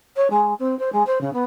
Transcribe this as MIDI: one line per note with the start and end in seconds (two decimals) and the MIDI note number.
0.16 0.27 73
0.30 0.53 56
0.59 0.77 60
0.79 0.92 72
0.92 1.03 56
1.06 1.20 72
1.21 1.32 49
1.33 1.44 59